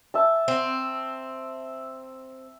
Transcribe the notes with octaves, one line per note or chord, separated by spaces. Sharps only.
E5 A5
C4